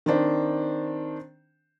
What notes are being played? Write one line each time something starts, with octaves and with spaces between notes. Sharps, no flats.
D#3 C4 D4 C5